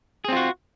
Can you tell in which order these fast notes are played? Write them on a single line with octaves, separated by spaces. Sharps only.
G#4 C4 F4 F#4